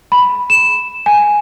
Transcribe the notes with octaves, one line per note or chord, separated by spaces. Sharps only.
B5
E7
G#5